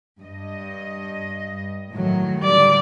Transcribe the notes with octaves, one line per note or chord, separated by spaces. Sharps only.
G2 D#5
A2 D#3 F#3
D3 G3 D5